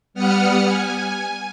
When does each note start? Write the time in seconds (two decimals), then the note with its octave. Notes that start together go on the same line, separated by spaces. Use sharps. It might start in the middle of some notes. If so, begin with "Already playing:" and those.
0.14 G3 B3 F#5 D#6 F6 C#7
0.64 G#5